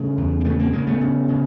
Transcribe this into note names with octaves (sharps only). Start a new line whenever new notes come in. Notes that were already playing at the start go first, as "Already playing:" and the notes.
Already playing: C#3 G3 A3
E2
C4
C#3 A3 B3
A#3 C4
C#3 G#3 A#3
A3 B3
C#3
C#3